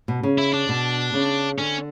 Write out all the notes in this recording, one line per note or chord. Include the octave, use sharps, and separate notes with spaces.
B2
C#3
E4
D4
B2
C#3
D3 C#4